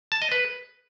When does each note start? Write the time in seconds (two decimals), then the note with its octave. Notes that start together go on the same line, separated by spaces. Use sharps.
0.12 A5
0.22 D#5
0.32 B4